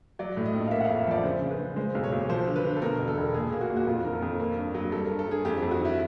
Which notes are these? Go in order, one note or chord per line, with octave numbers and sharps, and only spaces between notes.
F#3 D5
A2
D#5
A#1
F5
A#3 E5
F#5
F2 F5
E5
F3 D5
C#3 C5
C#3
B4
C#3
G#3 C5
B1
C#5
B1
F3 C5
D3
B4
D3
A4
B2 A#4
E1
A4
E1
A#2 G#4
A#3
F#4
A#2
F#4
F2 F4
D#3 A#4
A4
F2
A#3
G2
F#3
G3 A4
G2 A#4
A4
G2 G#4
F2 G4
F2 G4
F#4
D#3 E4